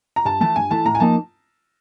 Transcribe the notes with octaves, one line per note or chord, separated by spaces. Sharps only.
A#5
G2 A5
E3 A3 A5
G2 G#5
E3 A3 A5
A2 A#5
G#5
F3 A#3 D#4 A5